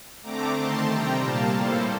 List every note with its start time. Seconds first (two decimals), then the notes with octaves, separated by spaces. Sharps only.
0.23 D3 A3 C4 A#5 D6
0.56 D#3 A3 C4 A5 C6
0.89 C3 G3 C4 G5 A#5
1.21 A#2 G3 A#3 F5 A5
1.55 A2 G3 A#3 A4 C5